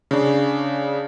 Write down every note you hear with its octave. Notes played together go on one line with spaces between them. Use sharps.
C#3 D4